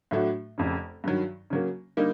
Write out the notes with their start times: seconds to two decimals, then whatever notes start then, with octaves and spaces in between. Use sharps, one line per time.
0.11 A2 F#3 A3 D4 F#4
0.58 F1 F2 C#3
1.04 G2 D#3 F#3
1.50 C#3 F#3 A#3
1.97 D3 G3 A#3 D#4